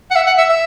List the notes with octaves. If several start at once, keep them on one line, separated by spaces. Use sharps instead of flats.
F#5
E5
F#5
E5
E5